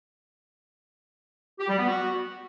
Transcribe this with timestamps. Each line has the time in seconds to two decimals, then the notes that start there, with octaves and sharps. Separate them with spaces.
1.59 G4
1.68 G3
1.78 B3
1.88 F#4